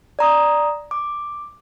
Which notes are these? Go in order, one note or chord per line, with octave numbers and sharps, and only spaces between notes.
D5 A#5 D#6
D6